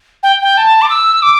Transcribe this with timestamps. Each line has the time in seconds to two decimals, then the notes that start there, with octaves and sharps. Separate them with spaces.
0.23 G5
0.42 G5
0.57 A5
0.82 D6
0.90 E6
1.22 D6